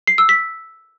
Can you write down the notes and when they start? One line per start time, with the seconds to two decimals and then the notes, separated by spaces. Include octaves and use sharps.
0.07 C7
0.18 E6
0.29 B6